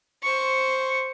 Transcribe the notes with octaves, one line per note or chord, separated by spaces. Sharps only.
C5 C#6